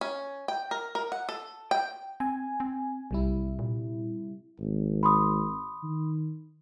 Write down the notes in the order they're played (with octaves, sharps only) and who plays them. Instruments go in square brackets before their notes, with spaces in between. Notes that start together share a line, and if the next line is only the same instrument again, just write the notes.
[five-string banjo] C#4
G5
A#4
A#4
F#5
A4
G5
[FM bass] C4 [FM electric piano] G#5
[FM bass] C4
[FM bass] B1 [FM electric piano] C3 G3 E4
[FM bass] A#2
[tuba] G#1
[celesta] B5 C6 D#6
[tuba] D#3